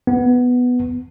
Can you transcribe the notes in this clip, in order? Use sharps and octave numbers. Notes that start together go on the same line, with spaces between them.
B3